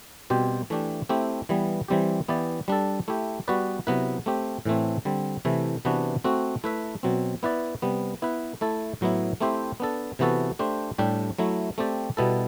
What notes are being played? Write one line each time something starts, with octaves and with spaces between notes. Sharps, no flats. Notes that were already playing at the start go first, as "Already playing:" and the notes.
B2 G3 C4 G4 C5
E3 A3 D4 G4
A3 C4 E4 G4
E3 G3 B3
E3 G3 C4 G4
E3 B3 E4 G4 D5
G3 D4 A4
A3 E4 G4
G3 B3 F#4 B4 D5
C3 F#3 B3 E4 B4
A3 C4 G4
A2 E3 A3 C4
D3 G3 C4
C3 E3 A3 E4
C3 E3 B3 D4 F#4
A3 C4 F#4
A3 E4 B4 E5
B2 F#3 C4
B3 E4 B4 D5
C3 G3 B3
B3 E4 B4
A3 E4 A4
A2 F#3 B3 E4
A3 C4 E4 G4 C5
B3 D4 A4
C3 E3 B3 F#4 A4
A3 D4 G4 C5
A2 G3 D4 G4
F#3 A3 E4
A3 C4 G4 D5
B2 G3 B3 E4 A4